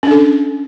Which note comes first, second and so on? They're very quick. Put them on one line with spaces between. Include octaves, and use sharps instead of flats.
C#4 D4 A4